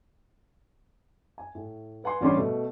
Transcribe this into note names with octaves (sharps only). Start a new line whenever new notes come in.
G#5
A2
B4 F#5 G#5 C6
A1 G3 C#4 D4 G4 C6
B2 A3